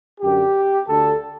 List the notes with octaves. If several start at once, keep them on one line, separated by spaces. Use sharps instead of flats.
F#2 D3 G4
D2 D3 A4